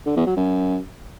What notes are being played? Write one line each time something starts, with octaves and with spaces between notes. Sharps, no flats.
D3
E2
F#3
F#2